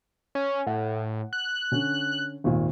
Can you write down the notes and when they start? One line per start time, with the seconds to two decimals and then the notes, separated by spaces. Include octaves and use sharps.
0.35 C#4
0.67 A2 F#5
1.33 F#6
1.72 D3 C#4
2.44 G#1 D#2 A#2